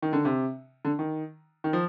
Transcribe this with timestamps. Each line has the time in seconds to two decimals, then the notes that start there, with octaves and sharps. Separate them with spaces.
0.02 D#3
0.13 D3
0.25 C3
0.85 D3
0.99 D#3
1.64 D#3
1.73 F3